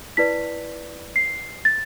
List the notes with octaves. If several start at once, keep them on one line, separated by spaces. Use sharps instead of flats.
E4 B4 D5 B6
C7
A6